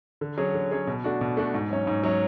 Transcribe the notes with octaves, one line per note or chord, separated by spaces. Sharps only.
D3
F#3 C#4 G#4
D3
F#3 C#4 G#4
B2
A3 D4 F#4
B2
A3 D4 F#4
G#2
F#3 C#4
G#2
F#3 C#4